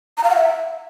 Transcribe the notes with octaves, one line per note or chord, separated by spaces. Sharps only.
A#5
F5
F#5
E5